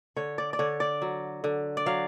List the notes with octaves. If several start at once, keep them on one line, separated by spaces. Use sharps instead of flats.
D3 C#5
D5
D5
D3 C#5
D5
F#3
D3
D5
F#3 F5